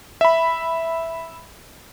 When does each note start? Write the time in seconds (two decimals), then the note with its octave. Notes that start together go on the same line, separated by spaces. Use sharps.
0.21 E5 B5